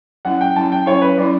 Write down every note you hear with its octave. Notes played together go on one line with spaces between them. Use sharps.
F#3 C#4 E4 F#5
G5
F#3 C#4 E4 A5
G5
F#3 C#4 E4 C#5
B4
F#3 C#4 E4 D5